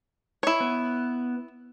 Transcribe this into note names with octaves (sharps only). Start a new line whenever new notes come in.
E4 C#5
B3